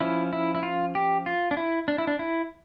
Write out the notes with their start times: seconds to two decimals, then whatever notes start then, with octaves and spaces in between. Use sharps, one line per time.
0.01 F3 C#4 E4
0.33 E4
0.55 E4
0.63 F4
0.95 G4
1.26 F4
1.51 D4
1.57 E4
1.88 D4
1.98 E4
2.07 D4
2.19 E4